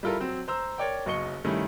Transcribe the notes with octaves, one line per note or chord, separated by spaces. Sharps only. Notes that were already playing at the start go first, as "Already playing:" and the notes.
G3 E4 F4 A4 A#4
F#3 C4
C5 A#5 E6
A#4 C#5 D5 G5
F#1 B1 D#5 C#6 C#7 G7
G2 C3 D#3 A3 C#4 E4